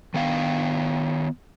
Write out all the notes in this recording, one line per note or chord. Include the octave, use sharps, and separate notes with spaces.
D#3 B3 F5 G5